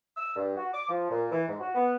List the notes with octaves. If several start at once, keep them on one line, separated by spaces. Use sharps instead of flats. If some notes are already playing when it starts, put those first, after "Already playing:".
E6
G2
F#4
D6
F3
A#2
E3
G#2
F#4
B3